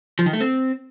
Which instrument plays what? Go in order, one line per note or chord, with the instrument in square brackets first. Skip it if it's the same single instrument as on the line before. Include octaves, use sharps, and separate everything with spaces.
[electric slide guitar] F3
D#3
A3
C4